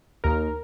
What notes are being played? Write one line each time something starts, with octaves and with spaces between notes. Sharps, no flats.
D#2 A#4